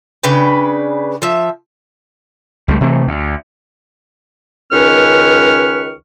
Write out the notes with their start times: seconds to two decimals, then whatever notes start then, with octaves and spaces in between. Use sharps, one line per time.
0.23 C#3 D4 B4 G5
1.22 F3 E5
2.68 C#2 G3 A3
2.81 C3 E3 A3
3.08 D2
4.72 C#2 D#3 C#4 B4 C#6 F6